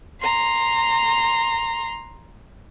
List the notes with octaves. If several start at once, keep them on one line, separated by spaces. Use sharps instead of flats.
A#5 C6